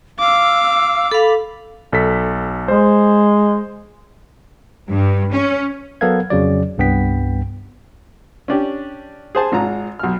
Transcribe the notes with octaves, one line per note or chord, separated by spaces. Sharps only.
F5 D6 E6
A4 F5 B5 D6
B1 A4 B6
G#3 C5
G2
C#4
F#3 B3 A4 A#4 F5 G#6
F2 C#3 F#3 D5
C2 G2 B3 G5 B6
C#4 D4 G4
G#4 C5 A5
G#1 G#2 F4 A#5
B1 F6